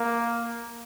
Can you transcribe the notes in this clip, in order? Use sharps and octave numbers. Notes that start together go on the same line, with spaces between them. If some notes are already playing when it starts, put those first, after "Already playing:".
Already playing: A#3